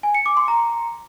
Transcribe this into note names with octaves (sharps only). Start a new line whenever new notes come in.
G#5
C#7
D6
C6
A#5